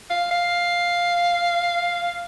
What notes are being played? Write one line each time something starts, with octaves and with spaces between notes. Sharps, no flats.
F5
F5